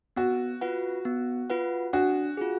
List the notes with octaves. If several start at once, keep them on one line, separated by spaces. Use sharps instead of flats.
B3 F#4
F4 B4 F#5
B3
F4 B4 F#5
D4 F#4
F4 G#4